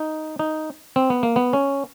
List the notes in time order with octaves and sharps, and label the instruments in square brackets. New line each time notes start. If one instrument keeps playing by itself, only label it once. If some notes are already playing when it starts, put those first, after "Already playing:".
Already playing: [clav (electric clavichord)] D#4
D#4
C4
B3
A#3
B3
C#4